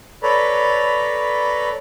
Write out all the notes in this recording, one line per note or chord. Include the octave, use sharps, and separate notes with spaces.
A4 B4 C#5 D5 A#5 B5